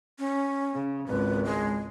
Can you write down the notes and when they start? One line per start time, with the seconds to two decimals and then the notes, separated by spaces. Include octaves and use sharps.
0.19 C#4
0.74 C#3
1.08 G#1 C#2 B4
1.45 G#3